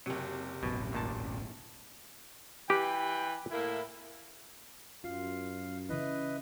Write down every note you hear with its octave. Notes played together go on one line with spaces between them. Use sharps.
F#1 C3 F#3
E1 A1 F#2 B2
D#2 A#2 A5
E3 G4 B4 G5
A2 A#3 E4
F#2 F4 F5
C#3 E3 E4 B4 D#5